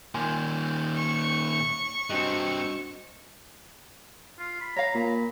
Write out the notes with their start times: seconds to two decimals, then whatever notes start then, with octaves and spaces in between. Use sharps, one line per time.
0.14 A#2 D#3 G#5 C6
0.96 C#6
2.10 G2 C4 D4 F#4 D#5
4.39 F4
4.61 B5
4.76 C#5 F5 A#5
4.95 A#2 B5